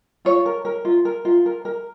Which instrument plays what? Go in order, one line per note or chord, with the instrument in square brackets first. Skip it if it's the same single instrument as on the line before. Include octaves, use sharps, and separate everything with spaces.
[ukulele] F4 C#5
A#4
A#4
F4
A#4
F4
A#4
A#4